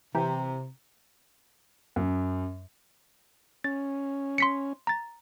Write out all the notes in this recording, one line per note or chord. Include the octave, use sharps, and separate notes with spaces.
C3 E3 G4 A#5
F#2
C#4 A6
C6 B6 C#7
A#5 A6